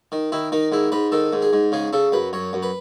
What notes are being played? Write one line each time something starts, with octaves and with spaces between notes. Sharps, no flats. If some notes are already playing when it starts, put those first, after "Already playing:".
D#3
D#3 E4
D#3 D#4
G#2 E4
G#2 B4
D#3 A4
G#2
G#4
G#2
C#3 G#4
C#3 A4
F#2 B4
F#2 C#5
F#2
B4